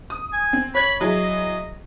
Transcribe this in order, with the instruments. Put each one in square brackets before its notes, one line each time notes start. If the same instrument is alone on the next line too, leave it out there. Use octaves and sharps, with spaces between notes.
[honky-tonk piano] D#6
[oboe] G#5
[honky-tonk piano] C4
[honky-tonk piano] C#5 G#6 F#7 [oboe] B5
[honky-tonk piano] F#3 E4 G#4 [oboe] D#5